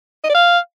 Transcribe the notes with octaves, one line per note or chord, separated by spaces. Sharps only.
D#5
D5
F5